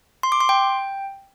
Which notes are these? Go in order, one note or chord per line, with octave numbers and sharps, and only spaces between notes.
C6
D6
C6
G5